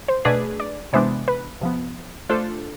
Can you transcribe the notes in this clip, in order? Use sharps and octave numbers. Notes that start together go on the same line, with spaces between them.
C5
B2 A3 D4 G#4 B4 D5
D5
C3 E3 G#3 B3 D4 C5
B4
C3 F3 B3
A3 D4 F4 A4 C5